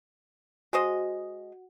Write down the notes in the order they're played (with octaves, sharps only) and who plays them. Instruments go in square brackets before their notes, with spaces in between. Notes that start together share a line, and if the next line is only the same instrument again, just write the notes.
[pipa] G#3 C5 D#5 [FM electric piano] F#4